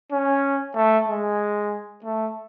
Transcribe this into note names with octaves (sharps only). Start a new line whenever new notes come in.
C#4
A3
G#3
A3